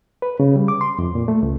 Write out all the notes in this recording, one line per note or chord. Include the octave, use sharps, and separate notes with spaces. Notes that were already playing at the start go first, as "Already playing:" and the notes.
B4
C#3
G3
D6
C6
F2
A#2
A3
C#2